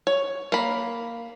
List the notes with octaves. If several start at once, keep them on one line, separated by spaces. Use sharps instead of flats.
C#5
A#3 B5